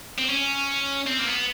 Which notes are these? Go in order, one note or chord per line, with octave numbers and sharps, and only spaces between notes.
C4
C#4
C4
A#3
B3